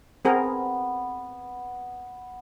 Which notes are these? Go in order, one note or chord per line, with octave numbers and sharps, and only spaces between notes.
B3 C4 G#4 A#4